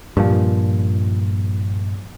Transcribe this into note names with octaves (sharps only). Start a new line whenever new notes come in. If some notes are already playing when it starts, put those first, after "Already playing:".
G2 A#2 F3